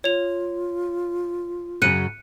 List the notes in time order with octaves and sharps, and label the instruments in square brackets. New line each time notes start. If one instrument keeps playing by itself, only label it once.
[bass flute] F4 [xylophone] C#5 F7
[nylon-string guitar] F#2 C#3 [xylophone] F#6 C#7 D#7